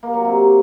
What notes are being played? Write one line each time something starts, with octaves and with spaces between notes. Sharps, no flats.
A#3
F#3
C3